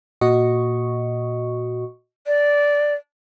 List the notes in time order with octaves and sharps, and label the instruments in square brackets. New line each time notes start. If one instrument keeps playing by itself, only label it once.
[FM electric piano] A#2 F#4 D#5 C#6
[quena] D5